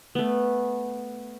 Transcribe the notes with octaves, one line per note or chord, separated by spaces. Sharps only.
A3 B3